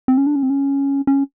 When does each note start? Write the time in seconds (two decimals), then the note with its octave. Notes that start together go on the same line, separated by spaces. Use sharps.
0.08 C4
0.18 C#4
0.27 D4
0.36 C#4
0.43 C4
0.50 C#4
1.07 C#4